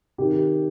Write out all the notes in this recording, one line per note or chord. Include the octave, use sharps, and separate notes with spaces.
C3 D#3 G4